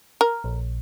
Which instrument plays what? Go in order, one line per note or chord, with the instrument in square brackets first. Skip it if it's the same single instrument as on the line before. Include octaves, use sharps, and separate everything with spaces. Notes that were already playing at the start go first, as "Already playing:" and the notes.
[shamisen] A#4
[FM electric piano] A#1